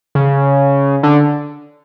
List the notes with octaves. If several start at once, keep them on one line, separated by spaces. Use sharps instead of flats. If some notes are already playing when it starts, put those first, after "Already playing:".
C#3
D3